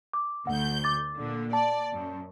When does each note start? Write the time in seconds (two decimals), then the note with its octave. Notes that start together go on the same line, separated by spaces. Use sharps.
0.13 D6
0.47 D2 F#5 G6
0.84 D6 A6
1.18 A#2 D3
1.53 D5 A5
1.92 F#2